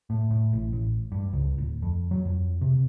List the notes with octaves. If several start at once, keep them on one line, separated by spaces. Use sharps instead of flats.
A2
A2
A1
A1
G2
C#2
D1
F2
F#3
F2
C3